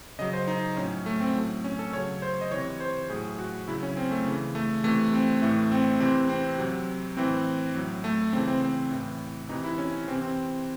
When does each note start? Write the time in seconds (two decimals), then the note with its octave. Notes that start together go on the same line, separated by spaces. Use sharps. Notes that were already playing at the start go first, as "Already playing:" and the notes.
0.19 C#3 D#5
0.21 F#3
0.33 C5
0.48 D#4
0.77 A2 F#3 C#4
1.06 A3
1.20 C4
1.35 A2 F#3
1.64 C#4
1.79 A4
1.93 C#3 F#3 C#5
2.22 C5
2.41 D#5
2.51 C3 E3 C#5
2.80 C5
3.10 A2 F#3 G#4
3.39 F#4
3.68 C#3 F#3 E4
3.83 C#4
3.97 C4
4.11 A3
4.26 C#3 E3
4.55 A3
4.84 C3 E3 A3
5.13 C4
5.42 A2 E3 A3
5.71 C4
6.00 C3 E3 C4
6.29 C4
6.58 C3 F#3
7.17 A2 E3 C4
7.74 A2 F#3
8.04 A3
8.33 C#3 E3 C4
8.47 C4
8.62 C4
8.91 A2 E3
9.49 C3 E3 D#4
9.64 E4
9.78 C#4
10.07 E3 C4
10.11 C3
10.22 C4